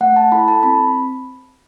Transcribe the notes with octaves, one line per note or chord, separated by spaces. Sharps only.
A3 F#5
A5
E4 A4 B5
A5
C4 B5